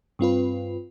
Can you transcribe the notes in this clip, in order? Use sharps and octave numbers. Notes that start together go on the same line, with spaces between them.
G2 C4 F4 B4